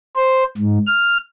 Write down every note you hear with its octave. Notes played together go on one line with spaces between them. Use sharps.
C5
G#2
F6